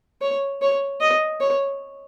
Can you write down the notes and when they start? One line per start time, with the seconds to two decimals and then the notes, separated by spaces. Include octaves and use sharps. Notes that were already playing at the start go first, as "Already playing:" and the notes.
0.22 C#5
0.62 C#5
1.01 D#5
1.41 C#5